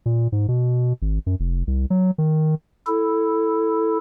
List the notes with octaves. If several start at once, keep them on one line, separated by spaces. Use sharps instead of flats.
A#2
G#2
B2
G#1
F#2
F1
C2
F#3
D#3
E4 A4